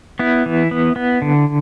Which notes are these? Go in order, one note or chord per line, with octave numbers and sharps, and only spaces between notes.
B3 E4
E3
B3
B3
D3